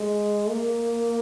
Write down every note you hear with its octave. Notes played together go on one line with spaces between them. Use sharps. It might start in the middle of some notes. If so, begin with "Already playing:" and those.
Already playing: G#3
A#3